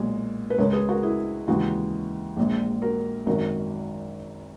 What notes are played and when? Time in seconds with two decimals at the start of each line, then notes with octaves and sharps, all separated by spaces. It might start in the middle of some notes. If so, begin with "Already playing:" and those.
Already playing: B1 A#2 G#3 F#4
0.50 B4
0.58 C#2 C#3 G#3 A#4 C#5
0.73 G#4 B4
0.89 F#4 A#4
1.03 E4 G#4
1.47 D#2 C#3 E3 G#3 F#4
2.37 A#1 A#2 G#3
2.82 F#4 A#4
3.26 G#1 F#2 D#3 F#3 F#4 A#4